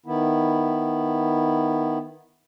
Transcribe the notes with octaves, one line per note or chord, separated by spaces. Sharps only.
D#3 B3 E4